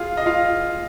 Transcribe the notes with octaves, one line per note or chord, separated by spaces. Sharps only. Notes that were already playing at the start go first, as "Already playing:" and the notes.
Already playing: F4 G#4 F5
D#5
F4 F5